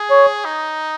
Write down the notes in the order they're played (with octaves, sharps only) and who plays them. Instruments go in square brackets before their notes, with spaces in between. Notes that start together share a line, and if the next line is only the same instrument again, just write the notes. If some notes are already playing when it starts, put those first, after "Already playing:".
Already playing: [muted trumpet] G#4
[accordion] C#5
[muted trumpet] D#4